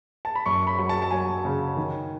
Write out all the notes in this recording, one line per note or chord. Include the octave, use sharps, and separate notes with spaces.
A5
B5
F#2 C#6
B5
F#3
A5
A5
F#3 G#5
C#3
D#3